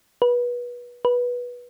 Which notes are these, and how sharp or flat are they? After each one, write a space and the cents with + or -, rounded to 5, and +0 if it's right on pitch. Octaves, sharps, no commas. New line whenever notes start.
B4 -25
B4 -15